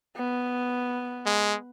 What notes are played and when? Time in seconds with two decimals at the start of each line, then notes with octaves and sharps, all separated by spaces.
0.16 B3
1.26 G#3